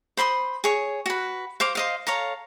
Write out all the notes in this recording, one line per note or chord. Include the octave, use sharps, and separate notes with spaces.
C5 B5 C6 D#6
G#4 C#5
F#4 B4
C5 F5 D6
C5 D#5 F5
A4 C#5 F5 A#5